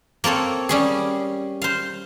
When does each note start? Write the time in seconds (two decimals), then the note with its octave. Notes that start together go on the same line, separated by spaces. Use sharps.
0.24 A#3 C4 A4 C#5
0.69 G3 C#4 G#4
1.62 C5 F5